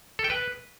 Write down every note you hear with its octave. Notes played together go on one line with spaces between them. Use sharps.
A4
G5
B4